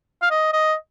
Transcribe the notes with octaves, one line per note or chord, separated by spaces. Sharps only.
F5
D#5
D#5